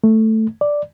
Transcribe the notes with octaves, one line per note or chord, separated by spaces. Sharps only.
A3
D5